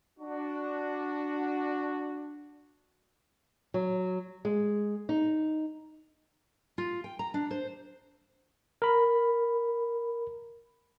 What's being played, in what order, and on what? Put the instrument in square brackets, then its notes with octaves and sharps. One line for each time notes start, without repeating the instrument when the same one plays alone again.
[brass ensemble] D4 F#4
[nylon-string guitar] F#3
G#3
D#4
[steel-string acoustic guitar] F4
G5
A#5
D4
C5
[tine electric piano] A#4 B5